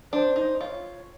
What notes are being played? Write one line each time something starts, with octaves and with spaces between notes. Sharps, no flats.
D4 C5
D#4
F4 C#5